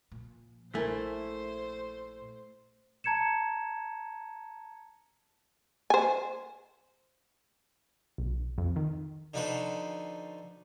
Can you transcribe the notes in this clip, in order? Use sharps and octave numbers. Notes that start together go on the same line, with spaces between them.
A#2 F3
A#1 A#2 A3 E4 A#4 C5 G#5
A5 A#5 G#6 C#7 E7
C5 G#5
B1
F2
D#3
D3 F3 D#4 F#4 B4 C5